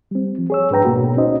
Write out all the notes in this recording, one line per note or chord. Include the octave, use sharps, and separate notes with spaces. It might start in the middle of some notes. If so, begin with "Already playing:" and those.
G3 C4
F3
G#4 C#5 E6
G#2 D4 B4 G5 A#5
D2 B2 A#3 F#4
C#4 D#4 C5 D#5